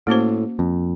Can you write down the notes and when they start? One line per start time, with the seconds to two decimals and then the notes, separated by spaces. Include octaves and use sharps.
0.07 A2 A#3 C#4 F#4 C5
0.59 F2